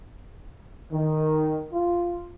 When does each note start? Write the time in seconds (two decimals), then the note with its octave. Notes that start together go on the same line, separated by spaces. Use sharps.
0.92 D#3
1.73 F4